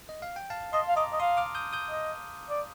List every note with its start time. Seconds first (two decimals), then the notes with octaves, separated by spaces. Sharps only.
0.09 D#5
0.22 F5
0.36 G5
0.50 F5 A5
0.73 D#5 A5 C6
0.88 F5
0.96 D#5 A#5 D6
1.12 D#5
1.20 F5 C6 D#6
1.37 D6 F6
1.55 D#6 G6
1.73 D#6 G6
1.90 D#5
2.50 D5